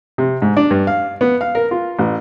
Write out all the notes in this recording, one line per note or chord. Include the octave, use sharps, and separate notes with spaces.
C3
G#2
D4
G2
F5
B3
F5
A#4
F4
A1